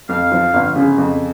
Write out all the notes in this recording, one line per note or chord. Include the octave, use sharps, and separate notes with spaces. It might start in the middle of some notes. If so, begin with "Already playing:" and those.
F2 F5
F3
G1
C#3
F2